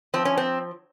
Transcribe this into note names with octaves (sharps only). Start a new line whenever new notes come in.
F3 C4
C#4
C4